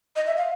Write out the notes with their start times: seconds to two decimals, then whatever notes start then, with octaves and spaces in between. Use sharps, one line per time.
0.16 D#5
0.27 E5
0.37 F5